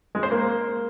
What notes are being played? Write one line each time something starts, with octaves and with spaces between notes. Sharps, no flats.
G#3
C5
A#3